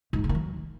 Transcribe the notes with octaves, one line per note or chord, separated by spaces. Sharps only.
G#2
F#3
D3
D#3
F#3